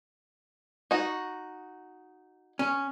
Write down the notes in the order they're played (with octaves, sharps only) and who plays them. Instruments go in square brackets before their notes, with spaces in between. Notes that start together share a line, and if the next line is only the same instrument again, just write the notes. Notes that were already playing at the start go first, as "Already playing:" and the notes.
[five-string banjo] D#4 F#4
[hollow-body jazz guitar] C#4